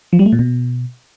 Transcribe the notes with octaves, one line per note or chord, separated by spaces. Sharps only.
F3
G3
A3
A#2
B2